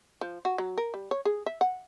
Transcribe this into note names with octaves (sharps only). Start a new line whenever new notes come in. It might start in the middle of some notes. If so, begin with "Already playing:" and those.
F3
F#4
F#3
A#4
G3
C#5
G#4
E5
F#5